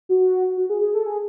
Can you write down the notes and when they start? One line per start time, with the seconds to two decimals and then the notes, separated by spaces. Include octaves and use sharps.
0.09 F#4
0.57 F#4
0.70 G#4
0.81 G#4
0.94 A4
1.06 G#4